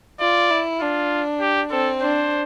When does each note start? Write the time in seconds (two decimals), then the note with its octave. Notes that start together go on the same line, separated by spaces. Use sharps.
0.20 F4 D5
0.51 E4
0.81 D4 F4
1.41 G4
1.71 C4 A4
2.01 D4 C5